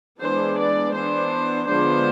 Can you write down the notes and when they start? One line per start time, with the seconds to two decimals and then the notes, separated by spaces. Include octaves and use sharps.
0.20 E3 G#3 B3 D4 C5
0.58 D5
0.94 E3 B3 D4 C5
1.67 D3 F3 G#3 B3 D4 C5